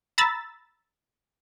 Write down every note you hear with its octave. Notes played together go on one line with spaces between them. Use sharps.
A#5 B5 E6 A6